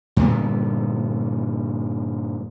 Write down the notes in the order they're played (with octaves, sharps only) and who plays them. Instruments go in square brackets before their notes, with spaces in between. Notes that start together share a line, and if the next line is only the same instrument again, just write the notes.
[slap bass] G2 A#2 D3 B3